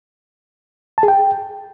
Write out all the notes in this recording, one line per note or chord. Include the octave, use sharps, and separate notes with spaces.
A5
G#4
G5